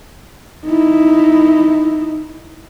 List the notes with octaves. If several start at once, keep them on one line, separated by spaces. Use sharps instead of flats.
D#4 E4